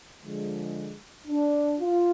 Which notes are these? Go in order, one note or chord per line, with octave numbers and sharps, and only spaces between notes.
D3 F3 G#3
D4
F4